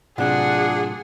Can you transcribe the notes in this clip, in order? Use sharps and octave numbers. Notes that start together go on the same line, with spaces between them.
A2 C3 F#3 D4 F4 G#4 F#5